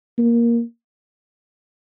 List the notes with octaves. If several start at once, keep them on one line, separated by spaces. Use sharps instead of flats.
A#3